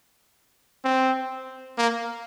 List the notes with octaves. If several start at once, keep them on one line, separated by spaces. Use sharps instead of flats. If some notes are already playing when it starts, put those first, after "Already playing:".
C4
A#3